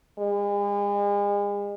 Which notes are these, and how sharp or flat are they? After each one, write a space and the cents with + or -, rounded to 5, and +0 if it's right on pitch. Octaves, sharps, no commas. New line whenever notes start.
G#3 -40